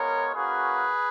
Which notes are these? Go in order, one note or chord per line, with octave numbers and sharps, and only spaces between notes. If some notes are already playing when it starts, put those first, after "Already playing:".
Already playing: G#3 B3 F4 A#4 C#5
A#3 C#4 F#4 G#4 B4